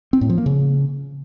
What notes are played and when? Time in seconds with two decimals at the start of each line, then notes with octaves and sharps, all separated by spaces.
0.13 C4
0.21 A2
0.30 F3
0.38 A#3
0.46 C#3